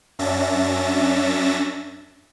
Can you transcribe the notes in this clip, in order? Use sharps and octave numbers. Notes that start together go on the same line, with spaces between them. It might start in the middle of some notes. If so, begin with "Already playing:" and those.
F#2 C#4 D4 E5 A6 A#6